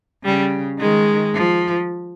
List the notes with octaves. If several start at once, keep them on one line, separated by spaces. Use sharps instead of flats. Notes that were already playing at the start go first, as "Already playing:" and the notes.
C#3 G3
D#3 G#3
F3